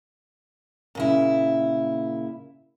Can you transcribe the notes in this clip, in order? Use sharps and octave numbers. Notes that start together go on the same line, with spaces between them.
A#2 C#3 E4